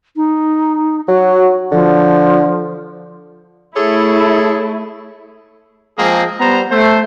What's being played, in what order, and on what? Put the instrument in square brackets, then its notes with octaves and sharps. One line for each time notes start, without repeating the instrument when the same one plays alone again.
[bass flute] D#4
[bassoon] F#3 [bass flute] F#4
[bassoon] D3 [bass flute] F3
[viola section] A3 E4 [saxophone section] G#4 A4 C#5
[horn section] F3 G#3 A#3 C4 G#4
G3 B3 C5 A#5
A3 C5